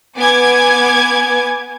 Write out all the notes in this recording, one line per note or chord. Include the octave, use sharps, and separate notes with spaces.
B3 G#5 D6 G#6